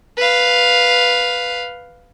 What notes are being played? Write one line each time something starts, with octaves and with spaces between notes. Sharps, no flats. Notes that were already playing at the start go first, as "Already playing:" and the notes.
B4 F5